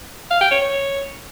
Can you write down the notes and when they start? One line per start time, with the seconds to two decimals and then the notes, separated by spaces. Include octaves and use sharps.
0.31 F5
0.41 G5
0.51 C#5
0.62 C#5